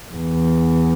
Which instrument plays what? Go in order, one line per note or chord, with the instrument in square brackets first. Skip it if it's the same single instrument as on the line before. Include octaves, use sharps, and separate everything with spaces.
[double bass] E2